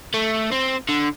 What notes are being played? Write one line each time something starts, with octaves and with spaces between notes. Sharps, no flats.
A3
C4
D3